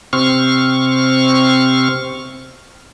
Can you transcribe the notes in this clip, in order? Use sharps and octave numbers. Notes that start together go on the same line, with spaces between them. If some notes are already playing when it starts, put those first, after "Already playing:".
C3 C4 C#6 F6